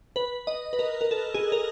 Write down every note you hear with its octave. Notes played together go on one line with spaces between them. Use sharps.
B4
D#5
B4
A#4
A#4
A4
G#4
A#4